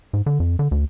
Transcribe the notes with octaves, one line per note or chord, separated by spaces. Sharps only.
G#2
D3
F2
D3
D2